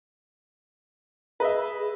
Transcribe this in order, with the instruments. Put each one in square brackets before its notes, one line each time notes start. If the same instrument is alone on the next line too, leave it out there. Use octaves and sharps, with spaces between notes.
[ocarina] G#4 [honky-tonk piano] B4 D#5 E5